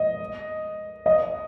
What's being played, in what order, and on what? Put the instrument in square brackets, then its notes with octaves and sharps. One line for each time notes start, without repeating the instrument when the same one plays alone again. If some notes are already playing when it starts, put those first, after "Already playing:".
Already playing: [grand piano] D#5
D#5